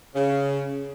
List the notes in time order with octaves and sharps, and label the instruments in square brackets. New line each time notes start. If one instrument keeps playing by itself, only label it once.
[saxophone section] C#3